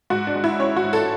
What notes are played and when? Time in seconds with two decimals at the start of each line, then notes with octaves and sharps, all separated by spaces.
0.10 G#2 F#4
0.27 D4
0.35 G#3
0.44 E4
0.59 C#4 C#5
0.76 F#4
0.84 G#2
0.93 A4